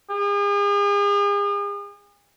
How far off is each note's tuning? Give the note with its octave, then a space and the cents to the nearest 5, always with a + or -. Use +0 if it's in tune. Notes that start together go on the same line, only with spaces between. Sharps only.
G#4 -40